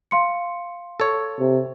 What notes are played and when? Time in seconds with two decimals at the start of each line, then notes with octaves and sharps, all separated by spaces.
0.11 F5 C6 C#7
1.00 A4 C#5
1.39 C3